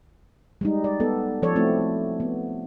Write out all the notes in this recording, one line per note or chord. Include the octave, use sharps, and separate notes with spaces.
G3 G#3 D#4
D5
B3 A4
F3 A4 C#5 D5
A3 C4 E4 F#4
B3